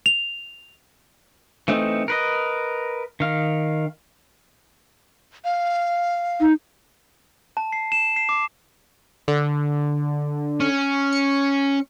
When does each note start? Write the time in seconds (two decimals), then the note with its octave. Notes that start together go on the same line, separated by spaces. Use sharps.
0.06 F7
1.68 E3 A3 C4 D#4
2.08 A#4 B4 D#5
3.20 D#3 F5
5.45 F5
6.41 D#4
7.57 A5
7.72 C7
7.92 E7
8.16 C7
8.29 D6
9.28 D3
10.60 C#4
11.13 C#7